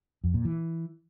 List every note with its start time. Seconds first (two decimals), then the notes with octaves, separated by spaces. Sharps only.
0.24 F2
0.34 A#2
0.45 E3